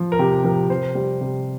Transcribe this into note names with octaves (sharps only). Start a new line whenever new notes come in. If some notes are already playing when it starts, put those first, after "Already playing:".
Already playing: F3
A#4
C3 G4
F3 A#4
C3 C5
G3
C3